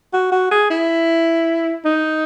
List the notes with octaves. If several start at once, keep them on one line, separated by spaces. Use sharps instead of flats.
F#4
F#4
G#4
E4
D#4